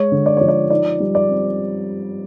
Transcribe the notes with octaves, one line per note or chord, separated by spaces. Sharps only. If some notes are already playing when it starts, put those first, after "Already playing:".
Already playing: G#3 C#5
D3
D5
F3 C#5
D5
D#4 D5
G3
D5
C4